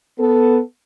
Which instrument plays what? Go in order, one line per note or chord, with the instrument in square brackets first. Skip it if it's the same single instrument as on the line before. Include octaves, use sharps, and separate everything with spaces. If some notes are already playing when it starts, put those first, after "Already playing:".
[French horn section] B3 A4